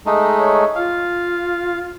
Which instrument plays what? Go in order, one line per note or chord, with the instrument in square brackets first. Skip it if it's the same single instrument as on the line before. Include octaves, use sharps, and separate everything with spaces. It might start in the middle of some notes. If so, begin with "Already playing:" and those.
[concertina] G#3 A3 D#4
[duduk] C#5
[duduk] F4 [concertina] F5